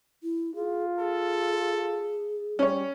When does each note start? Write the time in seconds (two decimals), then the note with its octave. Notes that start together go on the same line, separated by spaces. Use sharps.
0.23 E4
0.55 F4 G#4
0.99 G#4 A4
2.59 G3 C#4 C#5